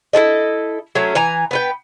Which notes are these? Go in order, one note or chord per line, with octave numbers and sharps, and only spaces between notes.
E4 F#4 A4 D#5
F#3 A3 C#4 E5
E3 G#5 A#5
B3 B4 G5